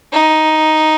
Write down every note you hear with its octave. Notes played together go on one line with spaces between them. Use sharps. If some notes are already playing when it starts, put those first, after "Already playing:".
D#4